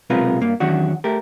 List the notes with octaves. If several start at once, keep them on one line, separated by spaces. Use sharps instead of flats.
B1 C3 G#3 F4 A#4 B4
G2 A#3
E2 D#3 F#3 C#4 D4 F#4
A3 G4 A#4